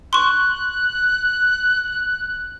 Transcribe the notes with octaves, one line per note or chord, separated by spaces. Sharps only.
C6 C#6 F#6